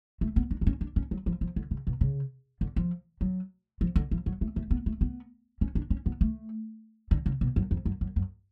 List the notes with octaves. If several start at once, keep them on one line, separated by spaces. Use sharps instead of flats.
A3
B3
D4
D4
C#4
D4
C#4
F#3
F3
F3
D3
C#3
B2
C#3
D3
F3
F#3
F3
D3
F3
F#3
A3
A3
B3
A3
B3
C#4
D4
C#4
B3
A3
D3
C#3
B2
F#2
F2
F#2
F#2
F#2